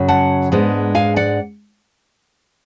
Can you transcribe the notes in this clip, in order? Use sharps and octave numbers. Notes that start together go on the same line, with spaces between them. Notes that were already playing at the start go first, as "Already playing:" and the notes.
Already playing: F#2 C#3 F#3
F#5 A5
G#2 G#3 B3 D4
F5 G#5
D5 F#5